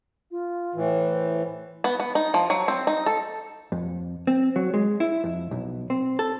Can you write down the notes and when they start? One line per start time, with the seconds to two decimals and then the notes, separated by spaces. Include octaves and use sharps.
0.31 F4
0.75 A2 E3
1.12 C5
1.84 B3
2.00 B3
2.15 D#4
2.34 F3
2.50 F#3
2.68 C4
2.87 D#4
3.06 A4
3.72 F2
4.27 C4
4.56 F#3
4.74 G#3
5.00 E4
5.24 F2
5.51 B1
5.90 C4
6.19 A4